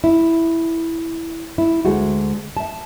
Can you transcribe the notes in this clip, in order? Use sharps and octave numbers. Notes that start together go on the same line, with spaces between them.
E4
E4
D2 G#3 A3 F#4
E5 A5